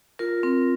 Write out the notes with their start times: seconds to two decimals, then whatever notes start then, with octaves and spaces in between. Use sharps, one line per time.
0.19 F4 A#4
0.43 C4 A#4